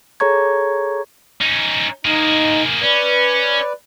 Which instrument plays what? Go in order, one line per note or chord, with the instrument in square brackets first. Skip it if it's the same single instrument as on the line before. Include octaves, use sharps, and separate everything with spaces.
[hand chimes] G#4 A4 C#5 A#5 C#6 G#6
[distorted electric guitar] C#4 D#4
[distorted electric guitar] A#3 G#4 [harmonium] D#4
[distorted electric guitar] C#4 [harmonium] B4 D5